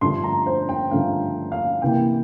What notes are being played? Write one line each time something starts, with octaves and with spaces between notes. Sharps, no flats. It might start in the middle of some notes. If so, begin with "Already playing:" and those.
G2 D3 F3 A3 C6
A#5
C5
G5
G2 D3 F3 A3 F5
F5
C3 E3 A#3 G5